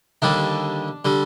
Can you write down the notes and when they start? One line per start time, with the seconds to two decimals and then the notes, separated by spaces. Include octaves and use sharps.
0.22 D#2 D3 G3 D4
1.05 D3 G3